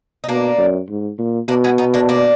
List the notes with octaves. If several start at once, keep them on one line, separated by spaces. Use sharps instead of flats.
D#4
B2 A#3 D4
F#2
G#2
A#2
B2 A#3 D4
G#3 B3
B3 D#4
A#3 D4
A#3 D4